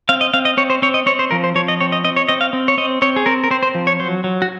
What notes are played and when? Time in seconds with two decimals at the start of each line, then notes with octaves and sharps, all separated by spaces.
0.09 C4 F5
0.21 D#5
0.34 C4 F5
0.45 D#5
0.57 C4 C#5
0.70 C5
0.82 C4 C#5
0.94 D#5
1.06 C4 C#5
1.19 C5
1.31 F3 A#4
1.44 C5
1.55 F3 C#5
1.68 D#5
1.80 C4 C#5
1.92 D#5
2.04 C4 D#5
2.16 C#5
2.28 C4 D#5
2.41 F5
2.53 C4
2.68 C#5
2.78 C4 D#5
3.02 C4 C#5
3.16 G#4
3.26 C4 A#4
3.44 A#4
3.51 C4 C5
3.63 C5
3.75 F3
3.87 C#5
4.00 F#3 C5
4.24 F#3
4.42 F#4